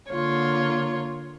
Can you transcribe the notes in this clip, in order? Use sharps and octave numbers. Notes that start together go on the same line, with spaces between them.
D3 A#3 F4 C#5